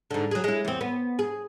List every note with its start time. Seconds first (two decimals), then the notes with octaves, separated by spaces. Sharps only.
0.11 G#2 D3
0.31 F#3 G#4
0.44 G#3 E4
0.65 E2 C4
0.81 B3
1.19 G#4